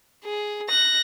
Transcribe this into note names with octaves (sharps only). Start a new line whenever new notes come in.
G#4
F#6 A#6